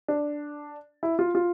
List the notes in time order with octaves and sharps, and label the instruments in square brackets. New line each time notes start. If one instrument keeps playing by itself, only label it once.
[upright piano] D4
E4
F4
F4